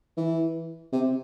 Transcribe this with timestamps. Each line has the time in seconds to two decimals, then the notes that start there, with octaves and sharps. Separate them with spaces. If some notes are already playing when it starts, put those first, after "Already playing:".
0.17 E3
0.92 C3